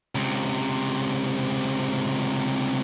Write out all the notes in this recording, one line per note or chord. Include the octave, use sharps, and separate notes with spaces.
C#2 C3